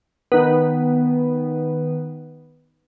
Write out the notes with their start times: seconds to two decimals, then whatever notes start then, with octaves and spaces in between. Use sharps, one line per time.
0.32 D#3 B3